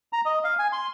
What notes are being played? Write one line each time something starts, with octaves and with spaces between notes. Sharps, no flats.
A#5
D#5
F5
G#5
C6